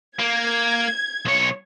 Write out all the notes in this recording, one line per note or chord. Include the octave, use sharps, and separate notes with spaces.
A#3 G#6
B1 C#5